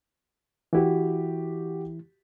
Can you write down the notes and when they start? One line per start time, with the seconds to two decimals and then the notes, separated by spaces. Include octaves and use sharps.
0.73 E3 E4 F#4 G4